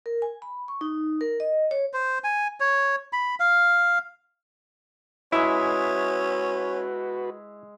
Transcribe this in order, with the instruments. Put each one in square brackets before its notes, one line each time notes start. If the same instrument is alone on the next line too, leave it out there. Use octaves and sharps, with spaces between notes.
[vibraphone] A#4
G#5
B5
C#6
D#4
A#4
D#5
C#5
[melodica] C5
G#5
C#5
B5
F5
[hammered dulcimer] G#3 E5 [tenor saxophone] C#4 [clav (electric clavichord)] E4 [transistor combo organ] F#4 B4